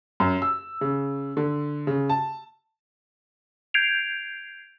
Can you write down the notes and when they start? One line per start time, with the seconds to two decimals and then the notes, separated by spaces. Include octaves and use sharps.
0.20 F#2
0.42 E6
0.81 C#3
1.37 D3
1.87 C#3
2.09 A5
3.74 G6 G#6 C7 D7 F7